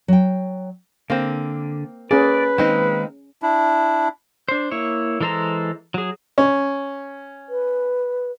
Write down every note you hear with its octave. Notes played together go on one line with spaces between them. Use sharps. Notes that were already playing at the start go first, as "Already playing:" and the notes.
F#3 G5
D3 A#3 C4
A#3 C#4 G#4 B4 D5
D#3 G#3 A#3 C4 D#4
D4 E4
D4 C5
A#3 E4 C#5
E3 G#3 A4 C5 A#5
F#3 G#4
C#4
B4